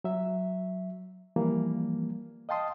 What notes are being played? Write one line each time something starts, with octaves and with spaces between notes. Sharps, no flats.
F#3 E5
E3 F3 G3 A#3
D#5 F5 G5 A5 C6 D#6